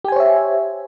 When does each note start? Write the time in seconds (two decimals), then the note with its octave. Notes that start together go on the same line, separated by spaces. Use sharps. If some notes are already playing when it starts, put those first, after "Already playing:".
0.04 G4
0.08 G#5
0.12 C5
0.16 C#5
0.20 E5